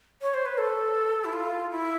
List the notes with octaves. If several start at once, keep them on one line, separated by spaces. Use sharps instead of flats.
C#5
C5
B4
A4
E4
F4
E4